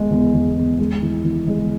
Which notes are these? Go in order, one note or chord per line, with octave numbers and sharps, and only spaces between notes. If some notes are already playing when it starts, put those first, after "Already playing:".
Already playing: E2 G#3
E2
E2
E2
G#3
E3
E3
G#3